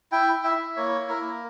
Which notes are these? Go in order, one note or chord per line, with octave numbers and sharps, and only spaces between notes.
E4 G5
E4
E5
E4
A#3 C#5
E4
A#4
A#3